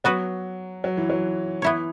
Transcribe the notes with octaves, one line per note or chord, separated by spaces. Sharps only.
F#3 B3 F#4 B4
F#3
E3
F#3
E3 B3 E4 C#5